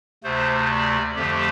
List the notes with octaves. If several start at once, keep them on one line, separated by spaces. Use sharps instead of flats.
D2 C3 A3 C5
D5
F2 D3 F3 A3 G4